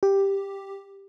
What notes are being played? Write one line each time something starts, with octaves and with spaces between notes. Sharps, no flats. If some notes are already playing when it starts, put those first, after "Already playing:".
G4